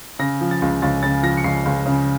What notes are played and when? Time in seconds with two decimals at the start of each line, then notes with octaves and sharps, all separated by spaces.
0.19 C#3 A#6
0.41 F3
0.51 A6
0.62 C#2
0.82 C#2 A6
1.03 C#3 A6
1.23 F3 A#6
1.37 C#7
1.44 C#2 C7
1.66 C#2
1.86 C#3